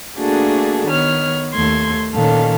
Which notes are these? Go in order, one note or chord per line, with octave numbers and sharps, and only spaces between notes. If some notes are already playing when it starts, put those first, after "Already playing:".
A3 A#3 D4 F#4 G#4 A4
D#3 B3 C#5 F6
D#2 A3 C6 G#6
A#2 D#3 C#4 A4 F5